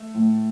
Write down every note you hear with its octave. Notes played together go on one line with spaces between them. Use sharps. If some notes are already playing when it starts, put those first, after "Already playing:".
Already playing: A3
A2